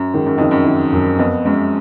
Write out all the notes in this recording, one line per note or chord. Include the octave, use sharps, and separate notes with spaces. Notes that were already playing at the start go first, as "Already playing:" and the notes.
Already playing: F#2
G#2 D#3
F#2
F2 D#3
F#2
D#3
F#2
F2 B3
F#2 G#3